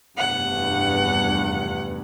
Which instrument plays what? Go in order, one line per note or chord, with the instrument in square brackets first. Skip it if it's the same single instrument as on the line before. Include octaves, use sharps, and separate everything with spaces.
[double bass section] F1 E2 G2 [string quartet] F#5